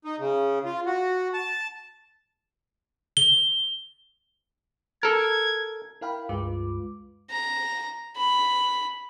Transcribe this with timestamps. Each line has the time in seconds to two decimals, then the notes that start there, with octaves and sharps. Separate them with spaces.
0.05 D#4
0.19 C#3
0.65 F4
0.86 F#4
1.34 A5
3.17 G7
5.03 A4 A#4 G#6
6.01 E4 A#4 F5 G5 B5
6.29 C#2 G2 G#3 F4 B4 D6
7.30 A#5
8.17 B5